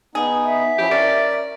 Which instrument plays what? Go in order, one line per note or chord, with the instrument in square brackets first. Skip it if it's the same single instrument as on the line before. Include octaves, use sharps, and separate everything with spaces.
[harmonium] B3 D#4 [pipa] G#4
[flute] E5
[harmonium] F3 C#4 E4 [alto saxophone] G4
[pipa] C#4 [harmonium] A#4 [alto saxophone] D5